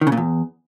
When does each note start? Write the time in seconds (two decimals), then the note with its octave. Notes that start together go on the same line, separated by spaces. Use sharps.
0.01 D#3
0.07 C#3
0.12 A#2
0.17 E2